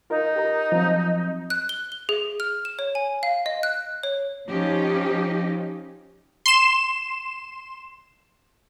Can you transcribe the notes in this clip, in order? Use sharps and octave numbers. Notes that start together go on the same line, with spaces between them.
D#4 F4 A#4
G4 A#4 A#5
F3 F#3 C4
F#6
G7
G7
G#4
F6
E7
C#5
G#5
F5
D#5
F#6
C#5
F3 C#4 D#4 G4
C6 E7